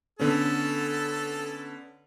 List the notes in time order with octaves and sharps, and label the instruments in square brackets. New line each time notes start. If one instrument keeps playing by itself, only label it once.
[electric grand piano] D3 B3 C#4 [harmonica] A4